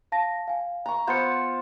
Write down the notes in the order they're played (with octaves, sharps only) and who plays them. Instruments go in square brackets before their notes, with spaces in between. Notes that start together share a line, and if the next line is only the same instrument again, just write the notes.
[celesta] F5 A5 A#6
F5 G#5
[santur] A#5 C#6
[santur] B3 F4 C5 [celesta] G6 C#7